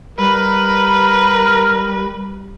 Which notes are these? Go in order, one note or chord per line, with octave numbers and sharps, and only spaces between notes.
G3 A#4 B4